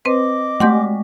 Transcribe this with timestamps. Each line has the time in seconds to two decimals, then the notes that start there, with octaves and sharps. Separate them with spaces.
0.05 C4 B4 C5 D#5 D6
0.60 G#3 A3 F#5 C6 G6